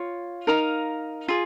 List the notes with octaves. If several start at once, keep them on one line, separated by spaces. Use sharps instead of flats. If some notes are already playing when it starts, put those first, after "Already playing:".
Already playing: F4 C#5
D#4 A#4 F5 A#5
F4 G#4